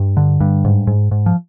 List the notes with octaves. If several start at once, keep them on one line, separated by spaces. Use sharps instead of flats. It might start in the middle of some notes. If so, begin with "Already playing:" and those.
Already playing: G2
D3
G2
G#2
G#2
G#2
F3